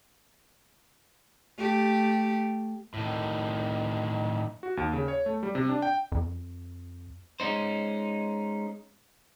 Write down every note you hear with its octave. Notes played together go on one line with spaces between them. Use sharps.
A3 G4
A2 D#3
F#4
D#2
C#3
C#5
A3
G3
C3
D4
G5
F2
G#3 C#4 D#4 C5